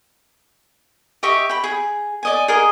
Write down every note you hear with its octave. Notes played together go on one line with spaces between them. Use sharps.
G4 D#5 E5 C#6
G5 B5
G#4
D5 D#5 G#5
G#4 A#4 D#5